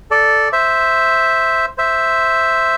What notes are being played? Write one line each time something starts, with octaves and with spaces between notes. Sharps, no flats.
A4 D5
C5 E5
C5 E5